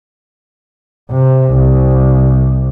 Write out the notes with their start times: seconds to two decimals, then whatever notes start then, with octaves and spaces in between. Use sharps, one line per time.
1.10 C3
1.53 C2